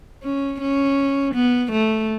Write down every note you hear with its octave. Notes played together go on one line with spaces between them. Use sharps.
C#4
C#4
B3
A3